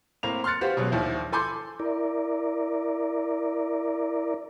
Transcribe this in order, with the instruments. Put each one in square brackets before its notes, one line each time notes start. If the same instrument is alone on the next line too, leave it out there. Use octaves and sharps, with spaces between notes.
[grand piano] A2 A#3 C4 F7
C6 F6 F#6 A6 C#7
F#4 G4 B4 C5 F5
B2 F#3 G#3 C#4
A#1 D#2 F3 E4
A4 G#5 B5 C6 D6 G6
[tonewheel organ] E4 A#4 D5